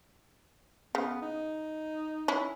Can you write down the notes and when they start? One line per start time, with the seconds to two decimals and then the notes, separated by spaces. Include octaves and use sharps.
0.95 C#3 B3
1.22 D#4
2.28 C#4 E4